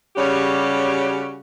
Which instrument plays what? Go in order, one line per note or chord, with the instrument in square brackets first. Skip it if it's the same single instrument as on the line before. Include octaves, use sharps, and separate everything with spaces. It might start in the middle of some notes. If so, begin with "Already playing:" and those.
[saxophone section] C#3 G3 C#4 F#4 G4